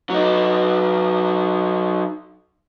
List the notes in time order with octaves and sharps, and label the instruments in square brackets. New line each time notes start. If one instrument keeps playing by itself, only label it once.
[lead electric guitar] F#3 D#4